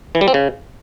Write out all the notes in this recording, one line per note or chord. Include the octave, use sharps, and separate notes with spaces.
E3
G3
C4
C#3